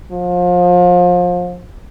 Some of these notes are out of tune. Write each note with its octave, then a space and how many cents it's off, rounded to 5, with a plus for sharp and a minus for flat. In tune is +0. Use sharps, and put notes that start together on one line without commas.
F3 +30